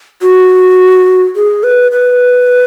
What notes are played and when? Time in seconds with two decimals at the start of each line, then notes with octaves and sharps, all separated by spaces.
0.22 F#4
1.36 G#4
1.63 B4
1.92 B4